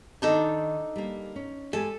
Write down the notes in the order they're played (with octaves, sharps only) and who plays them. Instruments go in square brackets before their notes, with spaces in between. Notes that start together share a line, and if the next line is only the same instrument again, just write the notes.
[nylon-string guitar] D#3 [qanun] D4 D#4 A4
[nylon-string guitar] G3 A#3
C#4
[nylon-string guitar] G#3 G4 G#5 [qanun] A4